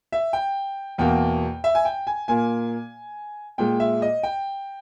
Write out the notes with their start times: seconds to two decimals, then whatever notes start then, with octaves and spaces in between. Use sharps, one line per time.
0.12 E5
0.33 G5
0.98 E2 B2 A#3 G5
1.64 E5
1.75 G#5
1.85 G5
2.07 G#5
2.28 A#2 A#3 G#5
3.58 A#2 G#3 G5
3.80 E5
4.02 D#5
4.23 G5